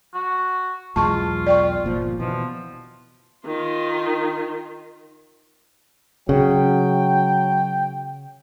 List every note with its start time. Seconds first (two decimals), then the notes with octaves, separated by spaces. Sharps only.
0.14 F#4
0.96 B1 E2 G#3 F4 A5 C#6
1.47 D5 G5 C#6
1.84 G1 A#2 F3
2.20 B2 E3 F3
3.46 D#3 F4
6.29 C#3 F#3 G5